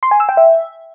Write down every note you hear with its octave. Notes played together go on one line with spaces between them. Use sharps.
C6
G#5
E6
G5
E5